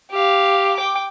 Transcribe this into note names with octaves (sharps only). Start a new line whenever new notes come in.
G4 F5
G5 D6